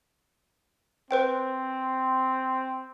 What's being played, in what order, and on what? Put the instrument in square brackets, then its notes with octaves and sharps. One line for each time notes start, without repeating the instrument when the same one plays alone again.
[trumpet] C4 [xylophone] B4 C5 G5